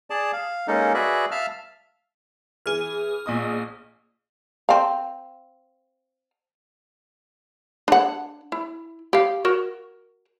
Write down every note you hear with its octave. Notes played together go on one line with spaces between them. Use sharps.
G#4 D5 A5
F5
G#3 A#3 C#4 D#4 A4
F#4 G#4 B4 D5 E5
E5 F5 A5 F6
E3 G#4 F6
A#1 D#5 D#6
C4 F5
D4 F#5
E4
G4 F5
F#4 A#4